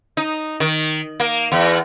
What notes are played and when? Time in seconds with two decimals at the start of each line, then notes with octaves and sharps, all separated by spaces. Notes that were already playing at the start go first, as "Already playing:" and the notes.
0.17 D#4
0.60 D#3
1.20 A#3
1.52 E2